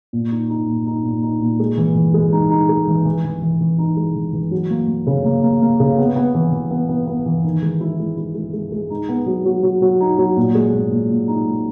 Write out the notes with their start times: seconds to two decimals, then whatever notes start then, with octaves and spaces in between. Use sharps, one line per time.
0.13 A#2
0.31 D#4
0.49 D#4
0.68 A#2
0.86 D#4
1.04 A#2
1.22 D#4
1.41 A#2
1.60 G#3
1.77 E3
1.96 E3
2.14 G#3
2.32 D#4
2.50 D#4
2.69 G#3
2.87 E3
3.05 E3
3.24 E3
3.42 E3
3.61 E3
3.78 D#4
3.97 G#3
4.16 E3
4.33 E3
4.51 F#3
4.70 A#3
4.88 A#3
5.07 C#3
5.25 A#3
5.43 A#3
5.61 A#3
5.80 C#3
5.98 B3
6.16 B3
6.35 E3
6.52 E3
6.71 B3
6.89 B3
7.07 B3
7.26 E3
7.44 D#3
7.62 G#3
7.81 E4
7.99 G#3
8.17 E4
8.35 G#3
8.53 G#3
8.72 G#3
8.90 D#4
9.09 B3
9.27 F#3
9.45 F#3
9.63 F#3
9.82 F#3
10.00 D#4
10.18 F#3
10.37 A#2
10.55 G#3
10.73 A#2
10.91 A#2
11.10 A#2
11.28 D#4
11.46 G#3